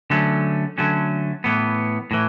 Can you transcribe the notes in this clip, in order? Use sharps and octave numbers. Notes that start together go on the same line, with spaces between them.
D3 F#3 A3 C#4
D3 F#3 A3 C#4
A2 E3 B3
A2 E3